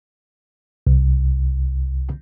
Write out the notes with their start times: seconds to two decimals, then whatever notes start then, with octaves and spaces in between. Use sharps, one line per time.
0.87 C2